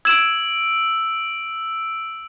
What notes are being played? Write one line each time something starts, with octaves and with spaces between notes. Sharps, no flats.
E6 G#6 D7 E7